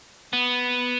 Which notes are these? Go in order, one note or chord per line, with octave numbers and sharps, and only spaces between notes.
B3